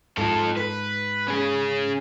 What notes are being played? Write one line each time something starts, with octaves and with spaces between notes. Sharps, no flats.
G#2 F3 A4
B4
C#4 G#4